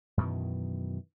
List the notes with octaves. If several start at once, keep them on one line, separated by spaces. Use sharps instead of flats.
F#2 B2 D#3 E3